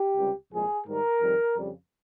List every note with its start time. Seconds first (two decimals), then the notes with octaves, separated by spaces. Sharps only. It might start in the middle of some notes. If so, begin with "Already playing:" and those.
Already playing: G4
0.17 C#2 C3 G3
0.52 C2 A#2 F3 G#3 G#4
0.87 G#2 D#3 G3 A#4
1.22 F2 D#3 G3
1.57 F2 C#3 G3